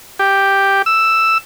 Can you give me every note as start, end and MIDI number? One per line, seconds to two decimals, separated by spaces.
0.19 0.82 67
0.86 1.38 88